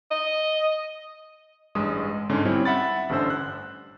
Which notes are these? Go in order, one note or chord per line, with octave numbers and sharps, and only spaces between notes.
D#5
A1 G2 G#3 D#6
G#2 D3 C#4
G3 C4 C#4 E4 C#5
E5 F#5 B5 A6
A1 G2 D3 C#4 C5 E6
F#6